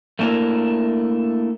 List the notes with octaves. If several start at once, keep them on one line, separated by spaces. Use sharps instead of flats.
A3 A#3 D4 E4 A#4